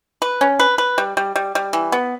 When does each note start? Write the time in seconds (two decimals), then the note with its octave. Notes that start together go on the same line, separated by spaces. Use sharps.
0.22 B4
0.41 C#4
0.59 B4
0.78 B4
0.98 G3
1.17 G3
1.36 G3
1.55 G3
1.73 E3
1.92 B3